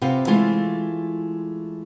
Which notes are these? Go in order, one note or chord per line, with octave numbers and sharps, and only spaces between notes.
C3 B3 F4 F5
E3 G#3 A3 F4